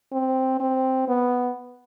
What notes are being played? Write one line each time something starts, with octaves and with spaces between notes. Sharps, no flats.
C4
C4
B3